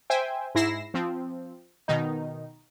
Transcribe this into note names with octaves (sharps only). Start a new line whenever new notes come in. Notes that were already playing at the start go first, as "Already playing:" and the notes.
C5 E5 G5 G#5
G#2 E4 A#6 C7 E7
F3 C4
B2 D#3 D#4